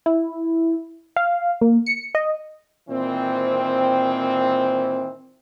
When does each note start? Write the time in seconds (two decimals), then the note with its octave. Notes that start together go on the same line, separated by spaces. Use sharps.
0.06 E4
1.16 F5
1.61 A#3
1.86 C#7
2.15 D#5
2.90 A#2 D#3 E3 C4